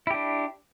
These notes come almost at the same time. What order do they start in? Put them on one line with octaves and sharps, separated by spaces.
E4 G4 D4